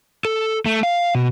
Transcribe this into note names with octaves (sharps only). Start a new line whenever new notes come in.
A4
A3
F5
B2